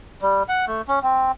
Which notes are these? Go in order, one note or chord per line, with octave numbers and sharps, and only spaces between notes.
G3
F#5
A3
C#4
C4